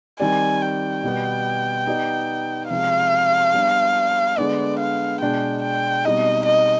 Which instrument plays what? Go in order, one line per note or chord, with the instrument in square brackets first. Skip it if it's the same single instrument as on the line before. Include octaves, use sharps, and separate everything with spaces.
[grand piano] D#3 G3 C4 G4 D5 [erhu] G#5
[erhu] G5
[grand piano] B2 G3 B3
B3 D#4 G4 D5
[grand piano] C3 F3 G#3 [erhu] F5
[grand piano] G3 B3 D4
[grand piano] D3 G#3 B3 [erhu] D5
[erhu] F5
[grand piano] B2 G#3 D4 [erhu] G5
[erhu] G5
[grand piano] B2 G3 C4 D#4 [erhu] D#5
[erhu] D#5